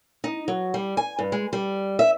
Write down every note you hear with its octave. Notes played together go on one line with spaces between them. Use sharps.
D#4
F#3
G3
G#5
G2
G#3
G3
E5